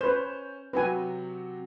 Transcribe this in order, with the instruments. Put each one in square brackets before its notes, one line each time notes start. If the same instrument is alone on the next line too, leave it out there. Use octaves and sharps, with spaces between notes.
[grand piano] C#4 G6 E7 [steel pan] B4 C5
[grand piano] C3 F#3 F#4 [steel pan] B4 G#5